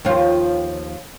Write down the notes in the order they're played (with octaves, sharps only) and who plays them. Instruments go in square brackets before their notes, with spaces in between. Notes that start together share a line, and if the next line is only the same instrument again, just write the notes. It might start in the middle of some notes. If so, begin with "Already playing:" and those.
[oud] D#2 F3 F4